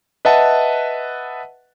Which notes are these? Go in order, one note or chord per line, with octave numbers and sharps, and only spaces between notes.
B4 D#5 E5 F#5 A5